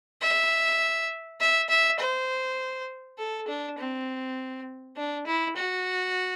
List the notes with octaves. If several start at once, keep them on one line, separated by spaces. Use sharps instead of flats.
E5
E5
E5
C5
A4
D4
C4
D4
E4
F#4